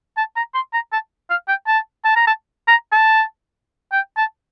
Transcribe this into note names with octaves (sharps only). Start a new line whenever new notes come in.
A5
A#5
C6
A#5
A5
F5
G5
A5
A5
A#5
A5
A#5
A5
G5
A5